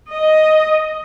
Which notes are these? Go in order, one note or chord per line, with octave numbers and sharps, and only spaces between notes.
D#5